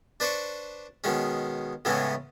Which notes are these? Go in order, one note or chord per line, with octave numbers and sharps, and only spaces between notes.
D4 B4 C5 D5 C#6
B2 D#3 G#3 C#4
A2 C#3 E3 G#3 B3 C#4